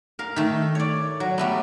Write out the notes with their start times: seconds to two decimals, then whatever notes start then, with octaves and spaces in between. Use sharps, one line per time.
0.19 A#4 F5
0.36 D#3 A3
0.75 C#5 D5
1.20 F#3
1.38 G3 A3 B3